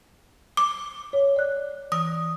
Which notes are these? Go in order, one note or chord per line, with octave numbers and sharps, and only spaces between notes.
D6
C#5
D5 F#6
E3 D#6